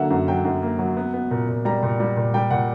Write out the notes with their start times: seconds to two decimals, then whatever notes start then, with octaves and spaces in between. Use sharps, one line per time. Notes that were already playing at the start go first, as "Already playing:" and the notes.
Already playing: D3 F#3 A#3 E5 F#5
0.11 F#2
0.28 F#3 G5
0.45 F#2
0.63 A#3
0.79 F#3
0.97 B3
1.14 B3
1.31 A#2
1.49 A#2
1.65 G3 A#5
1.83 A#2
2.00 G3
2.16 A#2
2.34 G3 G5
2.50 A#2 F#5